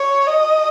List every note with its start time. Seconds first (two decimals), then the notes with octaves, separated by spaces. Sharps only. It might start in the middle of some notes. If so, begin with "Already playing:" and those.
Already playing: C#5
0.27 D#5